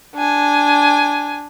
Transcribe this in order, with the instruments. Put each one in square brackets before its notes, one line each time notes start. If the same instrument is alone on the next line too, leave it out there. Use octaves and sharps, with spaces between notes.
[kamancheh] D4 G#5